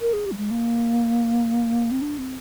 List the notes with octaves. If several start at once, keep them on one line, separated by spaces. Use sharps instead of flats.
A#4
G#4
G4
G3
G#3
A#3
C4
D4
C4